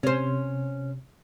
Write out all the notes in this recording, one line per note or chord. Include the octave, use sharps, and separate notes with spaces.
C3 C#4 C5